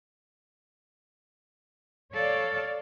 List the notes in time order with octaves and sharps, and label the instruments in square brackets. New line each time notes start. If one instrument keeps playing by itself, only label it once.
[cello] A4 [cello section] C#5 D5 F5